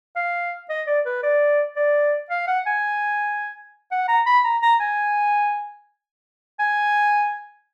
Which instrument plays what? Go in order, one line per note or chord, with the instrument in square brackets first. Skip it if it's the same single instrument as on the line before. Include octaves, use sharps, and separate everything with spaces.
[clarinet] F5
D#5
D5
B4
D5
D5
F5
F#5
G#5
F#5
A#5
B5
A#5
A#5
G#5
G#5